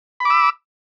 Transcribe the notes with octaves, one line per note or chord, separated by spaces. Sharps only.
B5 D6 E6